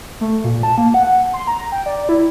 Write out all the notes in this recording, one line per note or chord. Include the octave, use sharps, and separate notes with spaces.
A3
A#2
A5
A#3
F#5
C6
A#5
G5
D5
E4